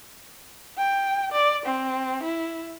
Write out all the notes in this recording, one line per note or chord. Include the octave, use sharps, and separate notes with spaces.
G5
D5
C4
E4